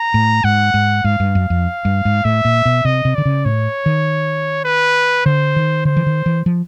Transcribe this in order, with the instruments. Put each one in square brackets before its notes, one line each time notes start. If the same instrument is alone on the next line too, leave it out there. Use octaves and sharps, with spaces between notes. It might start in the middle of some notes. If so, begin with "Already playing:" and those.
Already playing: [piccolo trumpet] A#5
[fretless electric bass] A2
[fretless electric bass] G#2 [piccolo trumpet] F#5
[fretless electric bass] G#2
[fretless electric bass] G#2 [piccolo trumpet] F5
[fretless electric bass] G2
F#2
F2
G2
G#2
[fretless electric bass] A2 [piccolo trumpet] E5
[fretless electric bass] A#2
B2
[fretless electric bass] C3 [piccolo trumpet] D#5
[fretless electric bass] C3
[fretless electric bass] D3 [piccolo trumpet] D5
[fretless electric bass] C#3
[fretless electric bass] A2 [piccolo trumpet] C#5
[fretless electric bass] D#3
[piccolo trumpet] B4
[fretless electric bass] D3 [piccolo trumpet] C5
[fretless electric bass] D#3
[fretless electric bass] D3 [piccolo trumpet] C5
[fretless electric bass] E3
D#3
E3
F3